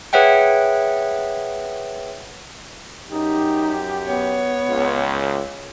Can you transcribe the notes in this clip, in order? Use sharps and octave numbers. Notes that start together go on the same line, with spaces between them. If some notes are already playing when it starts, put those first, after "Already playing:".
G#4 B4 C#5 E5 F#5 G5
F#2 D#4 G4
B3 C#5
C#2